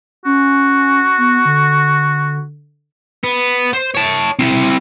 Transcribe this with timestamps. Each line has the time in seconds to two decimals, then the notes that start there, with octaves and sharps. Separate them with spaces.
0.25 C#4 F#4
1.18 B3
1.45 D3
3.24 B3
3.73 C5
3.94 C#5 A5
4.39 C4 E4